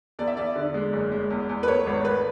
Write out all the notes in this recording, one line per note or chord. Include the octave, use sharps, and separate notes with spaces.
E2 D5
E5
E2 D5
D3
G#3
F#1
G#3
E2
E2
B4
A3 C#5
G#1
A3 B4